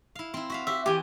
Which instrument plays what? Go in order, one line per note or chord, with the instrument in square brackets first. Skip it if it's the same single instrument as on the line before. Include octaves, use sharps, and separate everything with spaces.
[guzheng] E4 F5
C4 E4
F#4 E5 F5
[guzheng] F#4 G4 [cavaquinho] E5
[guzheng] E3 G#5 [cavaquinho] G4